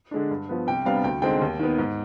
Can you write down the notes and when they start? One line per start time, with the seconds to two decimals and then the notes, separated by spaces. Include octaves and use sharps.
0.11 D3 G#3 D4
0.31 G2
0.49 F3 B3
0.67 C2 G5
0.85 C3 G3 B3 D4 F5
1.04 D2 G5
1.22 D3 G#3 C4 D#4 G5
1.41 D#2
1.59 D#3 B3
1.78 G#2